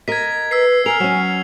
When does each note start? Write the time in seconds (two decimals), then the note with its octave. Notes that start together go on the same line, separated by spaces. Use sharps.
0.08 A#4 D#5 G#6 B6
0.51 B4 E6 B6 C7
0.86 A#4 G#5 F6 C7 F7
1.00 F#3 C#4